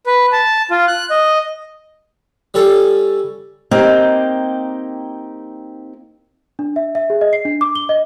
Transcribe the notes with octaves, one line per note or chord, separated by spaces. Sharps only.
B4
A5
F4
F#6
D#5
G3 C#4 A4
A#3 C4 D#4 G4
D4
E5
E5
G#4
D#5
C7
D4
D6
G7
D#5